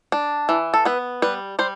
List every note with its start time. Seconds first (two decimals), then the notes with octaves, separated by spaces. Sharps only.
0.12 D4
0.49 E3
0.74 A4
0.85 B3 B4
1.22 G3 B4
1.59 G3 C5